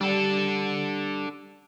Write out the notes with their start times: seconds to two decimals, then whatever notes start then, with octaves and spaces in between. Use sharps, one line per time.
0.01 G3 D4 A4